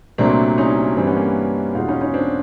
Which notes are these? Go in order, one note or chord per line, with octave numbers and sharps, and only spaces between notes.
C2 A#2 F#3 A3 C4 D4
C#4 D#4
G2 E3 G3 C4 D4
B3 C#4
A#3
B3
E2 B2 G#3 D#4 F4
C#4 D#4
C#4 D#4
C4 D4